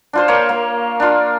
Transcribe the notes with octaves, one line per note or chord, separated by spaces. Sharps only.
D4 F4 C5
A#3 C#5
A#3
D4 F4